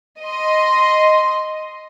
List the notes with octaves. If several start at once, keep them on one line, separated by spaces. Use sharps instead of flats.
D#5 C6